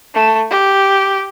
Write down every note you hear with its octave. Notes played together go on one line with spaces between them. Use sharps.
A3
G4